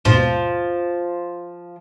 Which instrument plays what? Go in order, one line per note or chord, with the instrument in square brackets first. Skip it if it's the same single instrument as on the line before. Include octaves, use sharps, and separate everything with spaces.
[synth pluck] D#2 G#2 B2 [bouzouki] F3